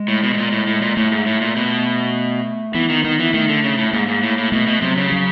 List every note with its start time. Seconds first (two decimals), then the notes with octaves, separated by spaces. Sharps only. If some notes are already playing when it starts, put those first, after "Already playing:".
Already playing: G#3
0.08 A2
0.23 B2
0.34 A2
0.37 A#2
0.52 A2
0.67 A2
0.82 A#2
0.97 A2 A3
1.12 G#2
1.27 A2
1.41 A#2
1.56 B2
2.74 E3 B3
2.89 D#3
3.04 D#3 B3
3.20 E3
3.34 D#3 A3
3.49 D3
3.64 C#3
3.78 A2
3.93 G#2 A#3
4.08 G#2
4.23 A2
4.38 A2
4.52 B2 A3
4.67 B2
4.82 C3 F#3
4.97 C#3
5.12 F#3